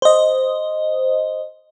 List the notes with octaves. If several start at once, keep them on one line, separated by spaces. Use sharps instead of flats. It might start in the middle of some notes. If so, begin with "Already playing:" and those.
C5 D#5